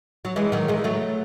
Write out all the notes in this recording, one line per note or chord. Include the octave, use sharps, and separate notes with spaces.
F#3
E3 G#3
D#3 F#3
E3 G#3
F#3 A3